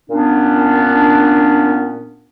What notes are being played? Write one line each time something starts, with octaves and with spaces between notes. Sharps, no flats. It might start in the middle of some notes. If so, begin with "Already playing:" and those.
A#2 B3 C#4 D4